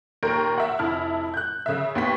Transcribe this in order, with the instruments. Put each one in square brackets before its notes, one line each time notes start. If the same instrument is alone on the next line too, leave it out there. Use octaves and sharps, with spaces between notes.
[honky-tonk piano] D#2 A#2 A#4 G6 D7
E5 F#5
F1 E4 A5 F6
F#6 G6
C#3 E5
D#2 B3 B6